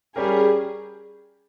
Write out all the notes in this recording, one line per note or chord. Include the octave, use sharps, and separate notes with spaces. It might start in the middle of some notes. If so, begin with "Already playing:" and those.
G3 C#4 G4 G#4 A#4